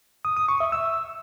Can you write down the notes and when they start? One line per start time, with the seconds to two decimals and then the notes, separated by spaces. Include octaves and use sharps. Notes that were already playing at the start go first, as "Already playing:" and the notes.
0.25 D#6
0.37 D#6
0.48 C#6
0.60 E5
0.72 E6